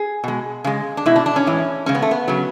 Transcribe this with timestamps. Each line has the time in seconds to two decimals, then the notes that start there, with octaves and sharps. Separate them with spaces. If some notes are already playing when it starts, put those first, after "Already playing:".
Already playing: G#4
0.24 B2 G#3
0.64 C#3 G#3
0.97 D4
1.06 B2 G#3 E4
1.16 D4
1.26 D4
1.36 C#4
1.47 A2 E3 G#3
1.86 C#3 G#3 C#4
1.95 B3
2.02 A3
2.11 B3
2.28 C#3 F#3